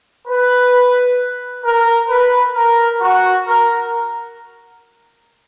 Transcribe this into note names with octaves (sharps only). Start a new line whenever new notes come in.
B4
A#4
B4
A#4
F#4
A#4